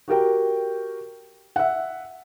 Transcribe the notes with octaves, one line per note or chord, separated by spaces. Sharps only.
F#4 G4 A#4 G5
E5 F#5